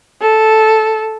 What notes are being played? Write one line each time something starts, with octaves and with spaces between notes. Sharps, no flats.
A4